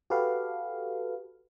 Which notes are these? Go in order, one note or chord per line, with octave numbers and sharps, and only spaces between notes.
F#4 G4 A4 B4 F5